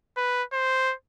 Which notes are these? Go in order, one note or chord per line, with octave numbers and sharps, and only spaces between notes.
B4
C5